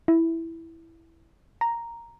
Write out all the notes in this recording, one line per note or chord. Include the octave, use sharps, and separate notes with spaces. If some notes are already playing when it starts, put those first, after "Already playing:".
E4
A#5